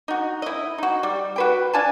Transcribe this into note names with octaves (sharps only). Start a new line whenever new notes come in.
D#4 F#4
E4 D#5
D#4 F#4
G3
F#4 B4 G5
D4 F4 G#5 A5